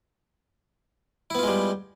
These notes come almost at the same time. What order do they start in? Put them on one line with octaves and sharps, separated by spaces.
E4 B3 F4 G#3 G3